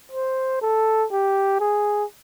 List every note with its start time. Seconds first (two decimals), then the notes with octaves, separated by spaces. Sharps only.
0.12 C5
0.61 A4
1.11 G4
1.60 G#4